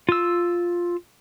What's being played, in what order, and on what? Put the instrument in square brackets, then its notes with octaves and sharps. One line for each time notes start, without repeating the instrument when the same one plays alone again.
[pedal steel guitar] F4 E6